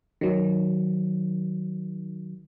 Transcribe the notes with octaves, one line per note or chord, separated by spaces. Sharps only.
D#3 F#3